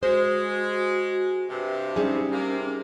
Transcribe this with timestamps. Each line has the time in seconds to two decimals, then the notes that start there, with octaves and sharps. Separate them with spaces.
0.03 G#3 F#4 C5
1.49 G2 C3
1.96 G3 C#4 D#4 G#4
2.32 C3 A#3